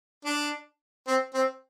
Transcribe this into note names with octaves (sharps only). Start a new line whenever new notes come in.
D4
C4
C4